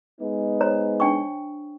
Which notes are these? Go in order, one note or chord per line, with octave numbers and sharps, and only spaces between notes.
G#3 B3 D#4
C5 C#5 A#5
D4 G5 C#6